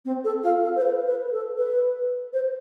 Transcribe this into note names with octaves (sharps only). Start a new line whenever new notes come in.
C4
A4
F4
A4
C5
B4
B4
A4
B4
C5